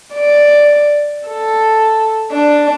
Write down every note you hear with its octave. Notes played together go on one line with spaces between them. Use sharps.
D5
A4
D4